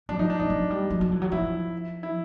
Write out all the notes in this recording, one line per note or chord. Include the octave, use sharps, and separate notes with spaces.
F#3 D4
F3 D#4
D4
F#3 D#4
F#3
G3
F#3
F#3
E3
F#3
F3 E4
E4